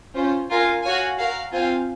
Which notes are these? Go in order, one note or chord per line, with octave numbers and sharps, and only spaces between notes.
C#4 F4 C5
F4 A#4 F5 G#5
F#4 C#5 F5 G#5
F#4 A#4 F5
C4 F4 C5 F5 G#5